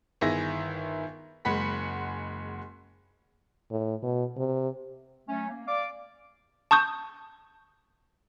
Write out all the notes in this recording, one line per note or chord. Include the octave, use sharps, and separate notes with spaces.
G1 D#3 E4 G#4 E5 A#6
F#1 G#3 F#5 B5 B6
A2
B2
C3
F#3 A3 C#4
A#3
D5 F5 D6
A5 C#6 D#6 G6